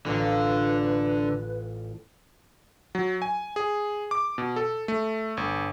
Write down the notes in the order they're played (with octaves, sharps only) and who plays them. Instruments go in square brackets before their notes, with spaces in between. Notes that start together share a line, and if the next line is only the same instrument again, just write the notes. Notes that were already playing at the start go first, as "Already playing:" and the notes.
[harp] A1 A#5 [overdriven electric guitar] D3 [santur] F4 [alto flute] B4
[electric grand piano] F#3
G#5
G#4
D6
B2
A4
A3
G1